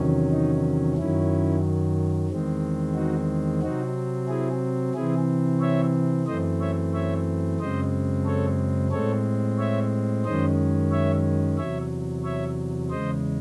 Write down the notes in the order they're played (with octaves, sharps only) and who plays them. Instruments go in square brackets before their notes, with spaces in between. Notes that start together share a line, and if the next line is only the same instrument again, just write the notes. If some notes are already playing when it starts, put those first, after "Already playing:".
Already playing: [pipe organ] E2 C3 D#3 F#3 C#4
D#4
F#2 D#3 F#3 C#4 E4
E2 D#3 G#3 C4
D#4 F#4
C3 F#3 C4 D#4 F#4
E4 G#4
C3 E3 C4 E4 G#4
C#5 E5
F#2 E3 A3 C4 C5 D#5
C#5 E5
C#5 E5
F#2 C#3 G#3 C4 C5 D#5
A4 C#5
A2 G#3 C4 A4 C#5
C#5 E5
F#2 D#3 G#3 C#4 C5 D#5
C#5 E5
E2 C3 F#3 C#5 E5
C#5 E5
E2 C#3 G#3 C5 D#5